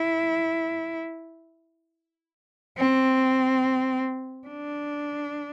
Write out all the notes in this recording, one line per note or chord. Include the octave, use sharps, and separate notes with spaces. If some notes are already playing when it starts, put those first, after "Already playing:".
Already playing: E4
C4
D4